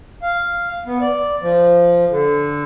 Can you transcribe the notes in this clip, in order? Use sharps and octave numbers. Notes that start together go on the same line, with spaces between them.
F5
B3
D5
F3
D3